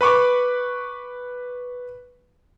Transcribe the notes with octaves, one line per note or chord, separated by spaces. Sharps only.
B4 B5 C#6 D6